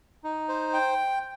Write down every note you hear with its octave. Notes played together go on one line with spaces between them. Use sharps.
D#4
C5
G5